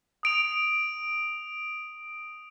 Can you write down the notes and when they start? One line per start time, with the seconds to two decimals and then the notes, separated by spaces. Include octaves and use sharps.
0.23 D#6 D7 F7